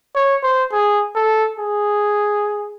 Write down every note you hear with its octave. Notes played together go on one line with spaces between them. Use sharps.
C#5
C5
G#4
A4
G#4